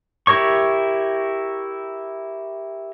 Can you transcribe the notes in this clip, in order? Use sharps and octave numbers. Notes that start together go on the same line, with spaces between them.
E4 G4 A#4 C#5 C#6